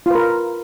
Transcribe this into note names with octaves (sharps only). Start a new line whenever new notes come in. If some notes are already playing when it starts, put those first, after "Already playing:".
F4 A#4 B4